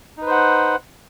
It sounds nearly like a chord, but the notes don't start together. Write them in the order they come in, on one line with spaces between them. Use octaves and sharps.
D#4 B4 C5 F#5